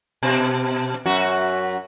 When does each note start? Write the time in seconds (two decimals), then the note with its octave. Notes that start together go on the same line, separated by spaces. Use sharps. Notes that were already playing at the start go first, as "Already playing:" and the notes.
0.23 B2
1.06 F#2 F#4